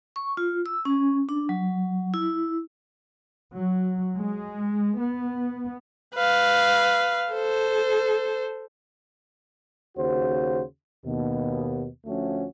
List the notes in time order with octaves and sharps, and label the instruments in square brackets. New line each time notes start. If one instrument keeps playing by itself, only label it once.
[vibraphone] C#6
F4
E6
C#4
D4
F#3
E4
[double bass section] F#3
G#3
B3
[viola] B4 F5
A4 C5
[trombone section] D#2 C#3 F#4 C5
D#2 B2
D2 F3 A3 C#4 F#4